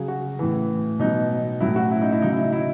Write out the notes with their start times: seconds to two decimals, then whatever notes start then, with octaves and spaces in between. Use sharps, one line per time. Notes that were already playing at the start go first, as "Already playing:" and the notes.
Already playing: C#3 F#3 G#4
0.08 F#4
0.39 A2 E3
0.99 B2 F#3 D#4
1.60 A2 F#3 E4
1.76 F#4
1.91 E4
2.02 D#4
2.12 E4
2.22 C#3 F#3 D#4
2.33 E4
2.42 D#4
2.52 E4